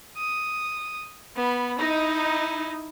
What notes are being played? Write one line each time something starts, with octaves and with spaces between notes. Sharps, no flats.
D#6
B3 B5
D#4 E4